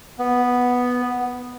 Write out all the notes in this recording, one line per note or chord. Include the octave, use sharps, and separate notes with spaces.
B3